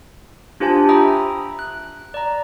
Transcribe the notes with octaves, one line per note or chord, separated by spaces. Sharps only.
D4 F4 G4 C5 G#5 A5
E5 G5 A#5 B5 D#6
F#6
D5 A#5